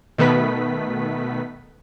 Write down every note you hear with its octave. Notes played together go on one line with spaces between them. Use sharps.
B2 D#3 A3 B3 B4 B6